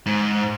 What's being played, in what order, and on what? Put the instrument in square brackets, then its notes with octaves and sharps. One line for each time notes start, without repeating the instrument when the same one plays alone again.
[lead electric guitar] G#2